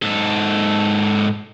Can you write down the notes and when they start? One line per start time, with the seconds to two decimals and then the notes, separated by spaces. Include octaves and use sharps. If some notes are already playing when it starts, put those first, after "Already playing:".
0.02 G#2 A4